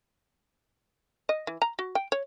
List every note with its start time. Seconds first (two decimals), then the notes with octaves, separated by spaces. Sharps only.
1.29 D#5
1.47 E3
1.62 A#5
1.79 F#4
1.95 G5
2.12 C#5